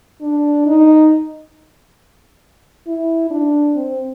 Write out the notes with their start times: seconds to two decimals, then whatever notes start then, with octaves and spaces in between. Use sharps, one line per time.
0.21 D4
0.66 D#4
2.87 E4
3.30 D4
3.76 C4